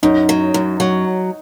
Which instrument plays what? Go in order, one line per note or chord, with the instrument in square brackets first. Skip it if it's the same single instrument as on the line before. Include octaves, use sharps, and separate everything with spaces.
[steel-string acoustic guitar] F#2 [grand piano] D#4
[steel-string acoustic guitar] F#3
F#2
F#3